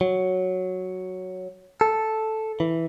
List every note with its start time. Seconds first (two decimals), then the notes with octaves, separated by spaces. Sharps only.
0.01 F#3
1.81 A4
2.60 E3